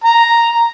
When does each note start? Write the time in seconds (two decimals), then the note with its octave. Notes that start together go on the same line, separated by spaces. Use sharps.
0.04 A#5